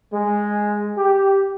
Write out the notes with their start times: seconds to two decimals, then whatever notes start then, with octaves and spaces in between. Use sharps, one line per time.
0.14 G#3
0.98 G4